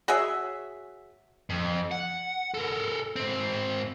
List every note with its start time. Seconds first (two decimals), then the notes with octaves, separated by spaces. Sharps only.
0.08 F#4 G#4 C#5 E5
1.50 F2
1.91 F#5
2.54 A4 A#4
3.16 G#2 C4